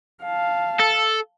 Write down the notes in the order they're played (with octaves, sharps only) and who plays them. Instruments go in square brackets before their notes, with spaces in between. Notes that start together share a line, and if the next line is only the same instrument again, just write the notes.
[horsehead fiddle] F5 A5
[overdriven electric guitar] A4